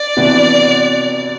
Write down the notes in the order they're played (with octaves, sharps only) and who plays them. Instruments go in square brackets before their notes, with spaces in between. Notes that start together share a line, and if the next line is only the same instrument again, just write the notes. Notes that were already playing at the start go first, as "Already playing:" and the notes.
Already playing: [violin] D5
[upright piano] C3 E3 B3 D4 F#4